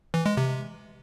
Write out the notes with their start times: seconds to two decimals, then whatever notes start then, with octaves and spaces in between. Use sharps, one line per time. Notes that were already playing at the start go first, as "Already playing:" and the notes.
0.14 E3
0.26 G#3
0.37 C3